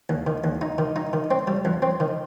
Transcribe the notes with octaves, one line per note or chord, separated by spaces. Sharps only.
D#2
D#3
D#2
D#4
D#3
D#4
D#3
C4
G3
F2
C4
D#3